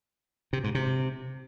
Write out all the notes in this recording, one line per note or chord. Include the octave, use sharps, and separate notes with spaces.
C3
G#2
C3